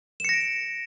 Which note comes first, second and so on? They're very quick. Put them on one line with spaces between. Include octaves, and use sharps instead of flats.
E7 C#7 A#6 D7